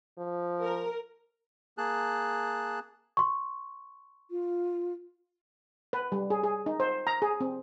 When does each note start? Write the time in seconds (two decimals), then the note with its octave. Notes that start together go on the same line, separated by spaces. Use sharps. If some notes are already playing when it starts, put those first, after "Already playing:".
0.18 F3
0.64 A#4
1.78 A#3 G#4 A5 F#6
3.17 C6 C#6
4.31 F4
5.93 B4
6.12 G3
6.30 G#4
6.44 G#4
6.66 D#4
6.80 C5
7.07 A#5
7.22 G#4
7.40 C4